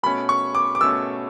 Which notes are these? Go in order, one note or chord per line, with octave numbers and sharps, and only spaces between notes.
B2 A3 C#4 B5
C#6
D6
D6
B2 A3 C#4 E6